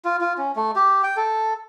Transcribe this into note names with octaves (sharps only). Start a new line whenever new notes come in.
F4
F4
C#4
A3
G4
G5
A4